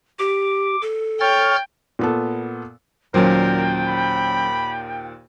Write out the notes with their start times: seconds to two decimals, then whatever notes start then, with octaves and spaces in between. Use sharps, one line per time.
0.19 G4 D6
0.82 A4
1.20 C#5 G5 F6 A6
1.99 A#2 B3 A4
3.14 D#2 A#2 F#3 C#4 A#4 C5 G5
3.87 B5